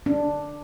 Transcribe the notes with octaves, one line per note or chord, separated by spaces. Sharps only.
D4